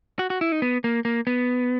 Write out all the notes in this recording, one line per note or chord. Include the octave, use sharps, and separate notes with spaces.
F#4
F#4
E4
D#4
B3
A#3
A#3
B3